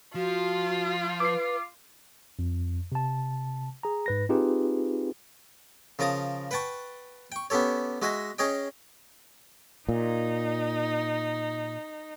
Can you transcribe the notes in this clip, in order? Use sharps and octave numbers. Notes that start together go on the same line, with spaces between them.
F3 F4 F#4
B4 D6 C7
F2
C3 A5
G#4 A#5
G#2 B4 A#6
C4 D#4 F4 G4 G#4 B4
C#3 F3 A#4 A5 D#6
B4 F#5 G5 A5 C#6
G5 C#6
B3 C#4 G4 A4 C#5
G#3 F#4 D#5 E5 G#5
C#4 G#4 C#5 D#5 G5
A#2 D#4